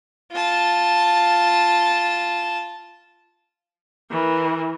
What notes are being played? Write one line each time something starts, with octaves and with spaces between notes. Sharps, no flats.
F4 A5
E3 A#4